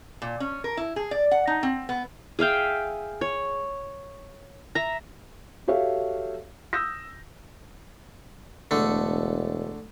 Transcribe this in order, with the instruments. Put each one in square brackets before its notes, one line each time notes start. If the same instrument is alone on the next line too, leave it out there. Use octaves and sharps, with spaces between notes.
[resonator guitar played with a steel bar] A#2
C#4
A#4
E4
G#4
D5
F#5
D#4
C4
B3
[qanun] G#4 E5 F5 G5
C#5
E5 A#5
[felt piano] F#4 G4 A4 C#5 E5 F5
D#6 E6 G6 A#6
[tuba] E1 [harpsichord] D3 A3